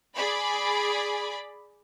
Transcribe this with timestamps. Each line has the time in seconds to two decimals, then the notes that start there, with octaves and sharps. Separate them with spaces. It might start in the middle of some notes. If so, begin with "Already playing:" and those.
0.16 G#4 D5 B5